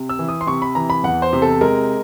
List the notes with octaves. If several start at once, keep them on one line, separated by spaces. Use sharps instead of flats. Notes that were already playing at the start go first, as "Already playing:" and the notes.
Already playing: C3
E6
E3
D#6
C6
C3 C#6
B5
E3 A#5
B5
E2 F#5
C5
C3
A4
G#3 A#4